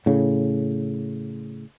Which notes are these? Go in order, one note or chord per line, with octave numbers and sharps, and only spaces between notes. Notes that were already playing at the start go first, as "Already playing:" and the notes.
A2 C#3